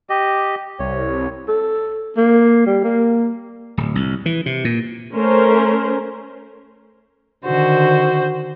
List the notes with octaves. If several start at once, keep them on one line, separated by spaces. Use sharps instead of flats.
G4 D#5
C2 C#5
A4
A#3
G3
A#3
D1
C2
E3
C3
A#2
A3 C#4 A#4 C5
D3 D#3 F#4 C5